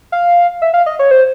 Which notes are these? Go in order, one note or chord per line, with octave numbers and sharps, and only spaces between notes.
F5
E5
F5
D#5
C#5
C5